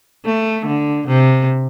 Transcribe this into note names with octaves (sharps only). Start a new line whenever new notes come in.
A3
D3
C3